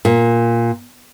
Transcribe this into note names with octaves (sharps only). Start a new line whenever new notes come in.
A#2